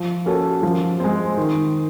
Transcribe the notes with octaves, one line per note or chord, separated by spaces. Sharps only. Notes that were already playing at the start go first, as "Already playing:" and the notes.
Already playing: F3
A#3 C#4 F#4 A4
F3
G#3 C4
D#3